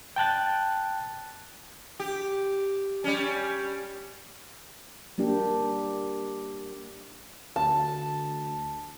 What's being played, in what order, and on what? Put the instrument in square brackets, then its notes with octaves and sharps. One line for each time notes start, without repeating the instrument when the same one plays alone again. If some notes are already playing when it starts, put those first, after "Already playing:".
[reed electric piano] G5 A5 F#6 A6
[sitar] G4
G3 C#4
[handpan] G3 A#3 D4 G4
[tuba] D2 [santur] A5